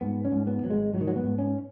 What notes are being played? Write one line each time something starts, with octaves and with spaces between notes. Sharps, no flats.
G#2 B3
C#4
G#2
B3
G#1 F#3
G#3
G#2 F#3
D#3
F#3
B3
G#2
C#4